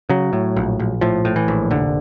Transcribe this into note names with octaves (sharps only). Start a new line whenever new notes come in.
C#3 F#3
A2
A#1
A#1
A2 F3
A2
E3
A#1
F1 D3